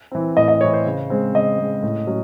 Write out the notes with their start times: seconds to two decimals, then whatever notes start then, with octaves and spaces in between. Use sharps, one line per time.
0.12 E3 C4
0.37 A2 D#5
0.48 D#5
0.61 E3 C4 C#5
0.73 C5
0.86 C#3
1.10 G#3 C4
1.34 C#3 D#5
1.59 G#3 C4
1.83 A2
2.07 F#3 C#4